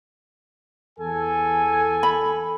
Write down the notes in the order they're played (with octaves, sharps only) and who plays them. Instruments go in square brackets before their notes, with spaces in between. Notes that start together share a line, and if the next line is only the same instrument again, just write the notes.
[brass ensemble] E2 G#5 [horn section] A4
[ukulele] B5